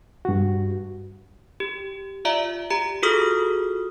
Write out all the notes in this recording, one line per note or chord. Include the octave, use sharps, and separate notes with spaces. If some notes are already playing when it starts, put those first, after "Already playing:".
G2 F#4
G4
F4 D5 E5 A#5 D7
G4 A#5
F4 F#4 G#4 A4 D#6 F6